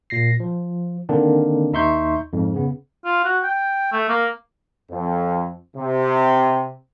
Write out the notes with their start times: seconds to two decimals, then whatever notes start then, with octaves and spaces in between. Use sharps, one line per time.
0.10 A#2 A#6 C7
0.40 F3
1.09 D3 D#3 A#3 C4 D4
1.73 D#2 D#4 E5 C6 C#6 G6
2.33 F2 G#2
2.54 C#3 B3
3.05 F4
3.24 F#4
3.43 G5
3.92 A3
4.09 A#3
4.90 F2
5.76 C3